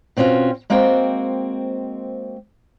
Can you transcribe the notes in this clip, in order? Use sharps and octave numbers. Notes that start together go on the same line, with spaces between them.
B2 C4 C#4 D#4 F4 F#4
G#3 A#3 C4 F#4 C5 G5